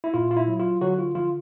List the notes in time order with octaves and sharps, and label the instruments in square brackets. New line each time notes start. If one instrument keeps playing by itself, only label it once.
[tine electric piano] E4
A#2 F4
F4
E4
F#3
F4
D3 F#3 F#4
F4
F3 F4